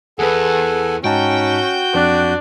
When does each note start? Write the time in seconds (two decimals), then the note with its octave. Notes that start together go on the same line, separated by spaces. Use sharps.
0.19 E2 G#4 A4 B4 F#5 G#5
1.04 G#2 C#4 D#4 F#4 G5 A5 G6
1.94 F2 D4 F#6